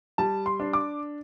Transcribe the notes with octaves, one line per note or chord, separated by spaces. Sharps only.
G3 A5
C6
D4
D6